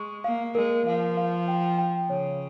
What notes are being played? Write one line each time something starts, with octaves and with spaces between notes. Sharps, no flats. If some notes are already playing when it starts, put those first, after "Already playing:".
Already playing: G#3 C#6
A#3 F5
G#3 A#4
F3 F5
F5
G5
G5
C#3 C#5